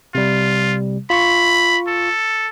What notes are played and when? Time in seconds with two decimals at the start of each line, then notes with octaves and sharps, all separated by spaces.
0.15 C3 G3 F4
1.10 F4 B5 C#6
1.88 A4